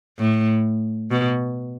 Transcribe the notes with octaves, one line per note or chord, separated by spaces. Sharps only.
A2
B2